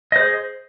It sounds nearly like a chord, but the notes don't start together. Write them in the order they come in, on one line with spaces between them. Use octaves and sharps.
D#5 C5 G#4